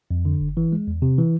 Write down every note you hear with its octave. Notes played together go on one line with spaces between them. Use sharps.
F2
D3
G1
E3
G#3
E2
C3
E3